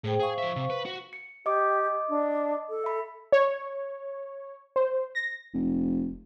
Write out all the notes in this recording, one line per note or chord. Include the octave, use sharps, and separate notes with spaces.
A2 G#4 C5 G5
G#4 C5 F5 C#6
F3 E5
C3
B4
F#4
C#7
G4 D#5 D6
D4
A4
E5 B5
C#5
C5
A#6
F1